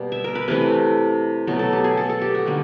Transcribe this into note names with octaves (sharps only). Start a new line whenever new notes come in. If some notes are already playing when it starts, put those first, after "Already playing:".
Already playing: B2 G3 A#3
E5
A#4
B4
C3 E3 A3 B4
B2 F#3 A3
A4
G4
G#4
A4
A4
G4
F#4
D3 G3 A#3 D#4